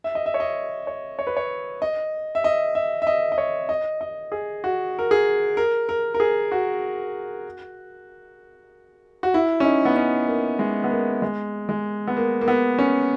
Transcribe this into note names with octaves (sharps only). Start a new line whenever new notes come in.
E5
D#5
E5
C#5
D#5
C#5
C#5
B4
C#5
D#5
E5
D#5
E5
E5
D#5
D#5
C#5
D#5
D#5
G#4
F#4
A#4
G#4
A#4
A#4
A#4
G#4
F#4
F#4
E4
C#4
D#4
B3
C#4
A#3
G#3
B3
A#3
G#3
G#3
B3
A#3
A#3
B3
C#4